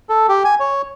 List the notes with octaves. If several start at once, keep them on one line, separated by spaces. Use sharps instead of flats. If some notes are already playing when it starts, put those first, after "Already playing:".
A4
G4
G#5
C#5